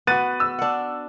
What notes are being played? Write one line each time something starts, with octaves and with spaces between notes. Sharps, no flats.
B3 F#4 F#6 A6 D#7
E6
D4 F#5